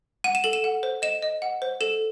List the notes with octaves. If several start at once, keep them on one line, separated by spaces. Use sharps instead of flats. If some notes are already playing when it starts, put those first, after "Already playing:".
F#5 D#7
E7
A4 F#7
E7
F#5
C5
D#5 E7
D#5
F#5
C5
A4 E7